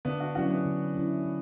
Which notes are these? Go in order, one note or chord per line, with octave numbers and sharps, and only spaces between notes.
D3 B3 D4
D4 F#4
F#3 C#4 D4 E4 F#4
B3 D4
D3
F#3 C#4 E4
D3